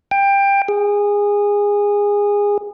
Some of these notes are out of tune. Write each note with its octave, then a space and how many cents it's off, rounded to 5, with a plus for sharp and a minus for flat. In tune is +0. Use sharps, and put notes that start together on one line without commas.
G5 +20
G#4 -20